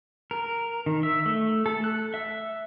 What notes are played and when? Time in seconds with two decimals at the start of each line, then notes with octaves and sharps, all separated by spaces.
0.31 A#4
0.86 D#3
1.03 E5
1.26 A3
1.66 A4
1.84 F#6
2.14 E5